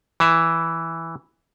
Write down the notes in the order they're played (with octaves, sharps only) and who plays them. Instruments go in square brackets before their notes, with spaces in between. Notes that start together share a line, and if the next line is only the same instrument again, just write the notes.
[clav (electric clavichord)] E3 E5